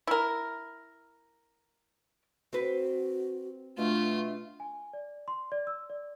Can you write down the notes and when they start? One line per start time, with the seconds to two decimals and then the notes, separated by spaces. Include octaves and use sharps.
0.07 E4 A#4
2.53 C4 F#4 B4
3.78 B2 A3 D4 F4
4.60 G#5
4.93 D5
5.28 C6
5.52 D5
5.67 E6
5.90 D5